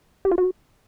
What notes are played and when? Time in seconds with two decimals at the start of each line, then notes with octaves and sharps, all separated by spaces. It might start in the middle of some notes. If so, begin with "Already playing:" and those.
0.25 G4
0.31 F4
0.38 F#4